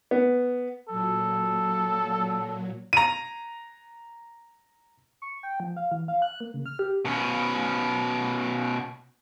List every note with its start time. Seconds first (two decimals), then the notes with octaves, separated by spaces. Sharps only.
0.11 B3
0.88 A#2 F#3 A4
2.93 A#5 D#7
5.22 C#6
5.43 G5
5.60 F3
5.76 F5
5.92 E3
6.08 F5
6.22 F#6
6.40 A#3
6.54 C#3
6.66 F6
6.79 G4
7.05 B2 C#4